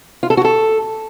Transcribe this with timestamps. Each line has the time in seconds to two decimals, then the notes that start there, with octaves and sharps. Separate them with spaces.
0.23 F4
0.30 A4
0.37 F#4
0.45 A4